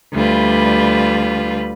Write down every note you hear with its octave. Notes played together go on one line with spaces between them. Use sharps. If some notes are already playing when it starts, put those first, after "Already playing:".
D2 G3 F4 B4